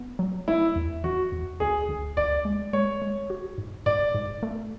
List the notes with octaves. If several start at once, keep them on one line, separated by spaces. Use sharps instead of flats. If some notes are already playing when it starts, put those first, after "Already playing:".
Already playing: B3
F#3
A3 E4
E2
E3 F#4
E2
D2 G#4
D2
D2 D5
G#3
G#3 C#5
G#3
F#4
G#2
G#2 D5
G#2
A3